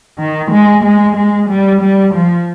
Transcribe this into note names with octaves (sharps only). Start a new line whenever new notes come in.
D#3
G#3
G#3
G#3
G3
G3
F3